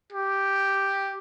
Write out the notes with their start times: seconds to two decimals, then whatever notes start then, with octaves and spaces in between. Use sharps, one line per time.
0.12 G4